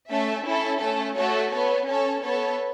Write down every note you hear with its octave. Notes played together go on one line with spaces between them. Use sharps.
A3 C#4 A4 E5
C#4 E4 A4
A3 C#4 A4
A3 F#4 A4 C#5
B3 A4 C#5
C#4 A4 C#5
B3 A4 C#5